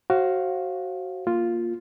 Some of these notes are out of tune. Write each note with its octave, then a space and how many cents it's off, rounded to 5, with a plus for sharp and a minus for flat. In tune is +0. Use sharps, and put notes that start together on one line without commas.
F#4 +15 C5 +35 F5 -5
A#3 +0 F4 +0